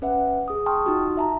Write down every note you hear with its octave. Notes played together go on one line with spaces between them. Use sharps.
C#4 B4 E5 F#5
G#4 D#6
G5 A5 C6 C#6 D#6 F6
D#4 F4 F#4
E5 A5 A#5